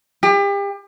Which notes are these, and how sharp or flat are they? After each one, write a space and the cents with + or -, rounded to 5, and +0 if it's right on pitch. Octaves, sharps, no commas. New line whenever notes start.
G4 +35